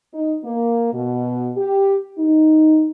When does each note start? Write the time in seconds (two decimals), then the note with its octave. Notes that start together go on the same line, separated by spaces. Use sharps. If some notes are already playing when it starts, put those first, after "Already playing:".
0.14 D#4
0.44 A#3
0.92 B2
1.57 G4
2.19 D#4